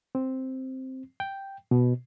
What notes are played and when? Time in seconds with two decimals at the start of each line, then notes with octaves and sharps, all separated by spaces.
0.15 C4
1.20 G5
1.71 B2